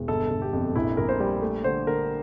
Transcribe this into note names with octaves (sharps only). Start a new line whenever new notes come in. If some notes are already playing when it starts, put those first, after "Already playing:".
Already playing: E1
G1 A4
G1
G4
F2
A#1 E4
A#1 A#4
C5
G3
A3
D3 C5
D3 A#4